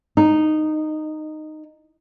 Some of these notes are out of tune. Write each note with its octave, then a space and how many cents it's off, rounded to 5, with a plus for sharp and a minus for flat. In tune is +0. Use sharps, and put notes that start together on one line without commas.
D#4 -10